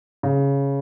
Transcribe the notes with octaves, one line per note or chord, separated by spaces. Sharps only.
C#3